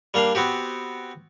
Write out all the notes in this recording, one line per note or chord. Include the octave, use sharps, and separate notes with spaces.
G3 A#3 D4 F5
B3 C4 F#4 G4